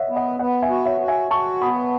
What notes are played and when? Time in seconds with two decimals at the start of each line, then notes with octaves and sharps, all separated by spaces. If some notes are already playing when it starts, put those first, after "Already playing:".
Already playing: C#5 D#5 E5 F#5
0.09 B3
0.16 D#5 F#5
0.39 B3 D#5 F#5
0.62 E5 G#5
0.70 F#4
0.86 C#5 E5
1.01 F#4
1.08 E5 G#5
1.31 F#4 A5 C#6
1.62 B3 B5 D#6